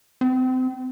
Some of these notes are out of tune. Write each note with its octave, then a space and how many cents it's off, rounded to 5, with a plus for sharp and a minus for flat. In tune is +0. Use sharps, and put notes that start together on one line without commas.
C4 -30